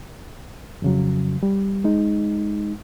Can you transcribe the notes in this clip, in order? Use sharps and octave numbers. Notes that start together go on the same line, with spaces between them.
F2 C#3 F#3
G3
G#3 D#4